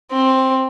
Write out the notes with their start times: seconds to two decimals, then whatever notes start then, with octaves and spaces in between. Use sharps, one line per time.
0.11 C4